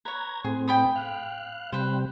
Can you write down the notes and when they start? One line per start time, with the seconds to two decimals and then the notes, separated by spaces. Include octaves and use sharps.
0.05 B4 C#5 A#5 G#6
0.44 A2 C4 G#4
0.68 G5 B5 D#6
0.96 F5 F#6
1.72 C3 G3 B4 C5